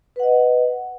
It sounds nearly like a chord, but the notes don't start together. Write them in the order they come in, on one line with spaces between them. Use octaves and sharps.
B4 F#5 D#5